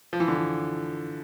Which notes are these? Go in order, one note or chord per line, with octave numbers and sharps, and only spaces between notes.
F3
E3
D3
E3